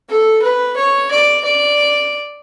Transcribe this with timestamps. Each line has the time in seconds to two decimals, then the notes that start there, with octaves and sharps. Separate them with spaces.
0.09 A4
0.42 B4
0.76 C#5
1.11 D5
1.45 D5